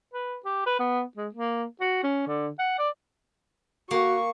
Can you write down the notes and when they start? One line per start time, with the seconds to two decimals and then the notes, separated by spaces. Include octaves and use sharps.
0.13 B4
0.45 G4
0.66 B4
0.79 B3
1.17 G#3
1.35 A#3
1.81 F#4
2.03 C#4
2.27 D3
2.59 F#5
2.79 D5
3.91 A#3 F#4 C#6